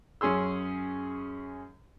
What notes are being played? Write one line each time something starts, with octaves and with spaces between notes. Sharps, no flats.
F#2 C#4 G#4 C6 E6